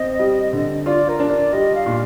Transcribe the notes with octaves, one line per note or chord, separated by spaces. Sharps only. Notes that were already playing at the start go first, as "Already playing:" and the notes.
Already playing: C4 D#5
G3
D3
F4 D5
A#4
D4
D5
G3 D#5
F5
A#2